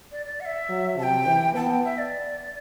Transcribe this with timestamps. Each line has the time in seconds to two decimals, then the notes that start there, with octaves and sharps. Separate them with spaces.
0.12 D5
0.26 D5
0.40 F#5
0.45 E5
0.69 F#3
0.98 C3 A5
1.03 G5
1.27 E3
1.55 B3 A5
1.70 G5
1.85 E5
1.98 D5